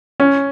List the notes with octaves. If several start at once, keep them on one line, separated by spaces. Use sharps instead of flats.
C#4